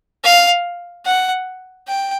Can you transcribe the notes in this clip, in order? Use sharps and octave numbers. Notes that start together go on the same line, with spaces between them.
F5
F#5
G5